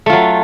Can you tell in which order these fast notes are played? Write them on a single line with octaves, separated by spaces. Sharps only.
A3 F4 F#3